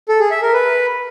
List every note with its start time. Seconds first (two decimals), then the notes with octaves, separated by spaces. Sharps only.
0.08 A4
0.20 G#4
0.31 E5
0.42 A#4
0.53 B4